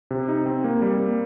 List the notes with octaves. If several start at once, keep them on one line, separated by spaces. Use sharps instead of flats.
C3
D#4
C4
A#3
G3
A#3